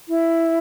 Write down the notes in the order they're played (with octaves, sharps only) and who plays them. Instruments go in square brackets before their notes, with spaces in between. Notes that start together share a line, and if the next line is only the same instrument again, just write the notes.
[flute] E4